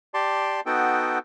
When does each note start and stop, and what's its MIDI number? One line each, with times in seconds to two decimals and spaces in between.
0.14 0.60 67
0.14 0.60 74
0.14 0.60 81
0.14 0.60 84
0.66 1.19 59
0.66 1.19 63
0.66 1.19 66
0.66 1.19 69
0.66 1.19 79